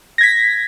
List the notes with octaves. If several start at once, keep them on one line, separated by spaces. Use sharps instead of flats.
G#6 A#6 B6